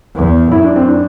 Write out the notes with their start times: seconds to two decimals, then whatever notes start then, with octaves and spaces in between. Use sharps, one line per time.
0.15 E2
0.52 F#2 E4
0.64 D4
0.76 C4
0.88 D4